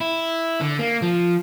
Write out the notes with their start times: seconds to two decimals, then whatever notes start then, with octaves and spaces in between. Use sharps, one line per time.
0.01 E4
0.61 D3
0.79 A#3
1.02 F3